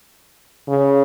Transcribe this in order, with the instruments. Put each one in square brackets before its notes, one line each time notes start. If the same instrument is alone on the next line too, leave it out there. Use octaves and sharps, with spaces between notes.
[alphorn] C#3